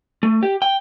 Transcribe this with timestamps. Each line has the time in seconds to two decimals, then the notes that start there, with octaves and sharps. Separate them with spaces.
0.23 A3
0.43 G4
0.62 G5